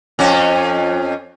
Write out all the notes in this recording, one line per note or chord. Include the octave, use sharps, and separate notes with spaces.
F2 C#4